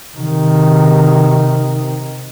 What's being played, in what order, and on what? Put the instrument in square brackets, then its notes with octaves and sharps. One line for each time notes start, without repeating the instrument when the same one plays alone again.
[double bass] C3 D#3